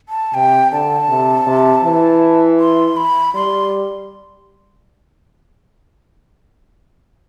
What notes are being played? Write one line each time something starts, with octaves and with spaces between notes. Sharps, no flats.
A5
C3 G5
D3 A5
C3
C3
E3
C6
B5
G3 C6